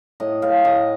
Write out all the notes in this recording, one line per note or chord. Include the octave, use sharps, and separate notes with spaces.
A2 D#5
A2 F5
A2 D#5